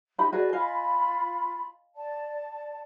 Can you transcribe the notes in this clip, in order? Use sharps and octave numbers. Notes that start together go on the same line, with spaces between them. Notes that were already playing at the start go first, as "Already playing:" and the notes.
D#4 G4 B5
F#4 G#4 B4 D5 D#5
F4 D#5 F5 G#5 B5
D5 A5